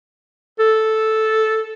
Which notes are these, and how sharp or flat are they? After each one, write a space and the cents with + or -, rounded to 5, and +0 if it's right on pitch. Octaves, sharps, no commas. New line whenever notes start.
A4 -5